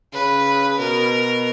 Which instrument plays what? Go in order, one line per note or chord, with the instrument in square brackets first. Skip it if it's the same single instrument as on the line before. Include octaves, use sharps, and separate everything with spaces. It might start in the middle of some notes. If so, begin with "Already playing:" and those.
[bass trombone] C#3 [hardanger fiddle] B4
[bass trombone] B2 [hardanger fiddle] A#4